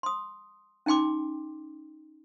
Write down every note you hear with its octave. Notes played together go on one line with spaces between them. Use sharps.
C6 D#6
C#4 D#4 G5 C6 D6